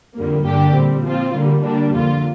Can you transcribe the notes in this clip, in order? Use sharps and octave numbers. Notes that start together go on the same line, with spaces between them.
F2 D3 G3 A#3
G2 D3 A#3 D4 G4
A#2 G3 C4
F3 C4 F4
D3 G3 A#3
D3 G3 A#3 D4
F2 D3 A#3 F4